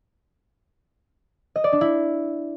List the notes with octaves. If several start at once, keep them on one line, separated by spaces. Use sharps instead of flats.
D#5
D5
D4
E4